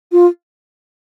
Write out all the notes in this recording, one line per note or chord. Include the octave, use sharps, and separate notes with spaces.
F4